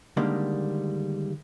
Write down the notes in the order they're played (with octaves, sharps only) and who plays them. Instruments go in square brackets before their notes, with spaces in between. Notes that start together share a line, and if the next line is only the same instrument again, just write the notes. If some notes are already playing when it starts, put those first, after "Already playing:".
[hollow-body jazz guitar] D3 D#3 G3 G#3 A#3